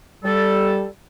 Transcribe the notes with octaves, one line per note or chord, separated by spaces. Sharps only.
G3 A4